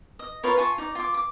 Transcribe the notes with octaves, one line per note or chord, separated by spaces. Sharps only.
D#5
F4 A#4 B4 C#5
F4 G#5 A5 C#6
D#4 D5
F4 D6
D6